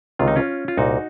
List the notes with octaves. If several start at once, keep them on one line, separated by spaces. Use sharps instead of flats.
C#2 C3 D#3 F4
D#4
C#4 F4
F4
C2 A#2 D#4 F#4